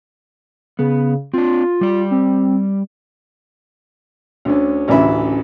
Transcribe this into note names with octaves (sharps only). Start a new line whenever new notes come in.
C#3 B3
C4 D4 F4
G3 D5
C4
D2 D3 C#4
A1 D2 C#3 E3 E5 B5